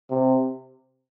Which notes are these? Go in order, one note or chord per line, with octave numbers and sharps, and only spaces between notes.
C3